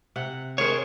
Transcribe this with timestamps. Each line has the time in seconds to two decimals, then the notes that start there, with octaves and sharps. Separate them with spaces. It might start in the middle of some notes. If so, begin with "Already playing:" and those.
0.16 C3 F#5
0.58 D#3 G#4 A#4 C5 C#5